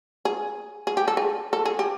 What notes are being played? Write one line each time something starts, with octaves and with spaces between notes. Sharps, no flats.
G#4
G#4
G4
A4
G#4
A4
G#4
G4